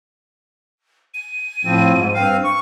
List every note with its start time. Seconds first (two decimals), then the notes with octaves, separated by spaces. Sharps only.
1.14 D#7
1.65 A2 F3 C4
1.94 G#2
2.14 G2 C4 F5
2.44 C#6